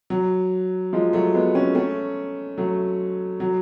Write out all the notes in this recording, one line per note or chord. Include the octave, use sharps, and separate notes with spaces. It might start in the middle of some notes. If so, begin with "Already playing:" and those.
F#3
F3 G#3
F#3 A3
G#3 B3
A3 C#4
A3 C#4
F#3 A3
F#3